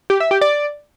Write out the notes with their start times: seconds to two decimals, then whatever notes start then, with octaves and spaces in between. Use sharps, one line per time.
0.10 G4
0.20 E5
0.31 G4
0.41 D5